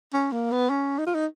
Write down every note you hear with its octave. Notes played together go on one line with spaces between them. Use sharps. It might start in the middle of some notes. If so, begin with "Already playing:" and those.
C#4
A#3
B3
C#4
D#4
F4
D#4